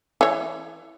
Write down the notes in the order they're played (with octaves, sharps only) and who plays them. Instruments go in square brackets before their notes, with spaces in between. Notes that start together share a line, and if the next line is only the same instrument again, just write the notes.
[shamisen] E3 C#5